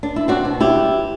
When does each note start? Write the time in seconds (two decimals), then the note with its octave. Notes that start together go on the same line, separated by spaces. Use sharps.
0.03 D4
0.16 E4
0.28 C4 D4 F#4
0.45 B2
0.60 G3 E4 G4